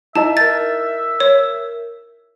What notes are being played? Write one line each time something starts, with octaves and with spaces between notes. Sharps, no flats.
D#4 E4 D#5 E5 A5
A#4 G6 A6
C#5